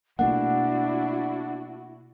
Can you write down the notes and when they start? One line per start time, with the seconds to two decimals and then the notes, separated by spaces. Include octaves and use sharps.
0.19 B2 A3 A#3 D4 E4 F#4 F#5